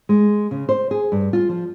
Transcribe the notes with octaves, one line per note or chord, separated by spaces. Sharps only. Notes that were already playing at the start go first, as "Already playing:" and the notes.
G#3
C#3
C5
G#4
G2
F4
F3